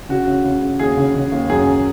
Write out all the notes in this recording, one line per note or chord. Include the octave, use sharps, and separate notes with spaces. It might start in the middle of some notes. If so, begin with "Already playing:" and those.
C#3 F#4
C#3
C#3
C#3
D#2 G#4
C#3
C#3
D#2
F#2 G#4